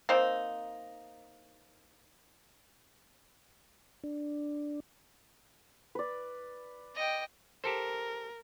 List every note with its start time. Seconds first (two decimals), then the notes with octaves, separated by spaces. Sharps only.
0.09 A#3 C4 D#4
4.04 D4
5.95 B4 D5
6.95 D#5 G5
7.64 G4 A4 A#4 C5